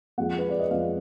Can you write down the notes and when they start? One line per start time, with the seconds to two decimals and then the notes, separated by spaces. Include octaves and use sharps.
0.18 F2 F3 G#3 F#5
0.39 B4
0.49 D5
0.59 D#5
0.71 F2 F3 G#3 F5